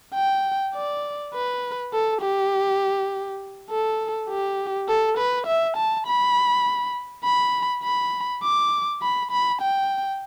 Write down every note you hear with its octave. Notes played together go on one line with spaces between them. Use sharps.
G5
D5
B4
A4
G4
A4
G4
A4
B4
E5
A5
B5
B5
B5
D6
B5
B5
G5